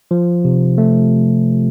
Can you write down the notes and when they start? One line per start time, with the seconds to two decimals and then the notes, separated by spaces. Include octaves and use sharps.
0.11 F3
0.45 C3
0.78 A3